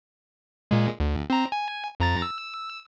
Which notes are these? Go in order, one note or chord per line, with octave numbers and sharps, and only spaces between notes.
A#2 G#3
D2
C4 A#5
G#5
F2 A#5 A6
E6